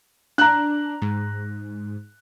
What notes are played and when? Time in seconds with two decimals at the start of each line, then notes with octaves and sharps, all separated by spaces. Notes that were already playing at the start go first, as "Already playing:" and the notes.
0.38 D4 A#5 F#6
1.02 G#2